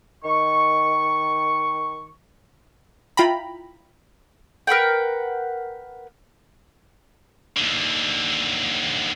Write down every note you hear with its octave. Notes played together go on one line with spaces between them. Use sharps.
D#3 C#6
E4 F4 G5 A#5 B5
A#4 B4 F#5 G5
D#2 D3